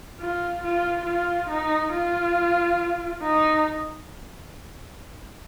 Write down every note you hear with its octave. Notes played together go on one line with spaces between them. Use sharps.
F4
F4
F4
D#4
F4
D#4